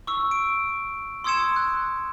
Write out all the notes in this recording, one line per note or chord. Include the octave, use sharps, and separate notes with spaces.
C#6 E6
D7
C6 D#6 E6 G#6 C#7 E7
F#6